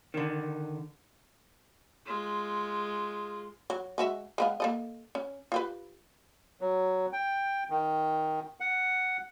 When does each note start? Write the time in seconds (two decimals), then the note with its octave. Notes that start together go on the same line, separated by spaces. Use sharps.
0.14 D3 D#3
2.06 G#3 F4
3.70 F#3
3.98 G#3 F#4 E5
4.38 G#3 B3 F5
4.60 A#3 A4 D#5
5.15 C#4
5.52 F4 G4 B4
6.61 F#3
7.13 G5
7.70 D#3
8.60 F#5